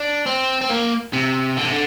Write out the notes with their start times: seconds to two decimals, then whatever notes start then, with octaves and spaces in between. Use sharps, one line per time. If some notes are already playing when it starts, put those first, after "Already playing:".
Already playing: D4
0.26 C4
0.61 C4
0.70 A#3
1.13 C3
1.57 D3
1.64 C3
1.71 D3